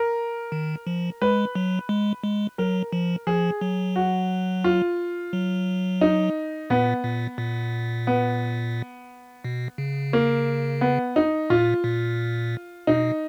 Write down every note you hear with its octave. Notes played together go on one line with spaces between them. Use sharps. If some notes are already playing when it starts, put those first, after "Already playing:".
Already playing: A#4
D#3
F3
G#3 B4
F#3
G#3
G#3
F#3 A#4
F3
F3 G#4
F#3
F#4
F4
F#3
D#4
A#2 B3
A#2
A#2
B3
B2
C#3
A#3
B3
D#4
A#2 F4
A#2
B2 D#4